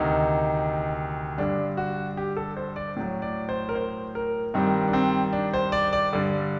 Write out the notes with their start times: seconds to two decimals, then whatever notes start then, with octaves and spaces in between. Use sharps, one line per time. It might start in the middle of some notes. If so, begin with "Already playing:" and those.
Already playing: D2 C3 D#3 D#4
1.38 G2 D3 G3 D4
1.77 F#4
2.17 G4
2.37 A4
2.57 C5
2.76 D5
2.96 A2 F#3
3.22 D5
3.49 C5
3.69 A#4
3.75 C5
4.15 A#4
4.54 G2 D#3 G3 C4
4.88 D4
4.93 C4
5.33 D4
5.54 C5
5.72 D5
5.93 D5
6.13 G2 D3 G3